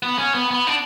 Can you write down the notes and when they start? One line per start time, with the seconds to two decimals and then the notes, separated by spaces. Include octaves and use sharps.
0.03 B3
0.19 C#4
0.34 B3
0.51 B3
0.67 D4